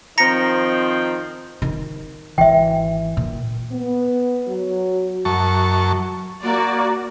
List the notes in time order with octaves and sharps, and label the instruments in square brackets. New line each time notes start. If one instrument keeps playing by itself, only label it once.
[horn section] D#3 F3 C4 [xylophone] A#5 A#6 C#7
[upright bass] D#3
[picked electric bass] G#1 E3 [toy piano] E5 G5
[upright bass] A#2
[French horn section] B3
F#3
[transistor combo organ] F#2 A5 C#6
[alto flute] A#3 [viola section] F#4 D5